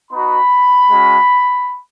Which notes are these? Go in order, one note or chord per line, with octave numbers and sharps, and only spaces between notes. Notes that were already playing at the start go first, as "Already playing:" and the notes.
B3 D#4 F#4 B5
G#3 C#4 F#4